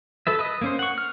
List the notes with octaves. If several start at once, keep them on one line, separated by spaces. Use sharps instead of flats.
A4 B4 E5
B4 D#5
A#3 C#4 C5
F#5 C#6
F6